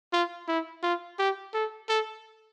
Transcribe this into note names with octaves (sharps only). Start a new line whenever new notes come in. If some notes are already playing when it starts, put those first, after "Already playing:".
F4
E4
F4
G4
A4
A4